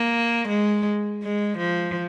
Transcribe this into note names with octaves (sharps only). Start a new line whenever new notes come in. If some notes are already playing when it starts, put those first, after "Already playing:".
Already playing: A#3
G#3
G#3
F3